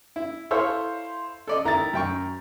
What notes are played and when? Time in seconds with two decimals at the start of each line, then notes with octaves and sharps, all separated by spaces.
0.16 E4
0.51 E4 A4 C5 C#5 E5 F5
1.47 A4 D5 D#5
1.65 D#3 E4 A#5 A6
1.93 F#2 G5 C#6